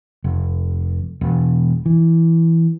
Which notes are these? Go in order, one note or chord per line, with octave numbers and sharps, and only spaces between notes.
F1
E1
E3